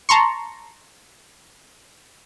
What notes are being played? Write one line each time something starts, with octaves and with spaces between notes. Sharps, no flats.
A5 A#5 C6 C#6